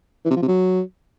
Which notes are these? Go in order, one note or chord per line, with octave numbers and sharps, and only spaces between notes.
E3
C3
F3
C3
F#3